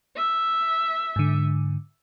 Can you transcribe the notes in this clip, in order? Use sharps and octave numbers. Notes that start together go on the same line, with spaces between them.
E5
G#2 D3